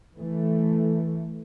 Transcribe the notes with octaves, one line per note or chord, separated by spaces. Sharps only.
E3 A3